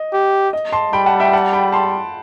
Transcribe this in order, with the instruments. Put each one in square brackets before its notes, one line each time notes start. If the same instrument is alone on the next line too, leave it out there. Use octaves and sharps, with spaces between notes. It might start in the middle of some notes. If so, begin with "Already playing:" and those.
Already playing: [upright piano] D#5
[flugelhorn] G4
[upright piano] D#5
A5 C6
[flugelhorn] G3 [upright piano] G5 B5
[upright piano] F#5 A5
E5 G5
F#5 A5
G5 B5
A5 C6